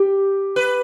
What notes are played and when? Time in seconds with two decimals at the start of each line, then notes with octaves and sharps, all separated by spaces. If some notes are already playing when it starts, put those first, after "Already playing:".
Already playing: G4
0.56 B4